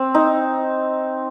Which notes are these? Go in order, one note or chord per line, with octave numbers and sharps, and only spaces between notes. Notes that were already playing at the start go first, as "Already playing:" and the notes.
Already playing: C4
D#4